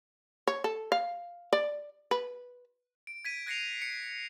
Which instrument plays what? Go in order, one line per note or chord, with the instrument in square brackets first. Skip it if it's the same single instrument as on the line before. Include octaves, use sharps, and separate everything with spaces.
[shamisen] C#5
A4
F5
D5
B4
[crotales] D7
G#6 B6 D#7
F#6 G#6 A#6 C7 C#7 F7
C#7 D#7